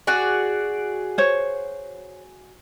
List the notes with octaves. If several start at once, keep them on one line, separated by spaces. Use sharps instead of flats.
F#4 G#4 D5
C5 C#5